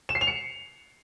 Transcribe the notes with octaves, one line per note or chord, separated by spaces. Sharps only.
E7
C7
F7
C#7